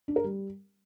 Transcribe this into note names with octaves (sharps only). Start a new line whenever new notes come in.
D4
A#4
G3